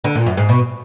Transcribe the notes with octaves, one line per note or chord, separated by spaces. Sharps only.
D3
A#2
F#2
G#2
B2